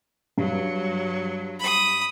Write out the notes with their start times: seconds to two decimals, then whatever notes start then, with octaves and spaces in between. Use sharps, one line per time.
0.38 G2 F#3
1.60 B5 D#6